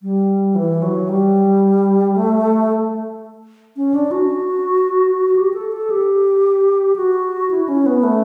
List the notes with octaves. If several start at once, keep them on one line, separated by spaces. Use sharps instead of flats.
G3
E3
F#3
G3
A3
C#4
D4
F#4
G4
A4
A4
G4
F#4
E4
C#4
B3
A3